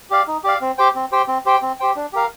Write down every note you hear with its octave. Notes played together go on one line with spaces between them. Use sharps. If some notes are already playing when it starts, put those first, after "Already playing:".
G4 D5 F5
D#4
G4 D5 F5
C4
G4 C5 G5
C4
G4 C5 G5
C4
G4 C5 G5
C4
G4 C5 G5
D4
G4 A#4 F5